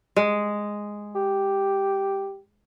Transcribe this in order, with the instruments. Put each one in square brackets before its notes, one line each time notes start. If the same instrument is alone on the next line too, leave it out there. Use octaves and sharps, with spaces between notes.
[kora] G#3
[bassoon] G4